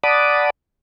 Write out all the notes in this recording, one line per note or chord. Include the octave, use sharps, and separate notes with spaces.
D5 F#5 A5 B5 D6 D#6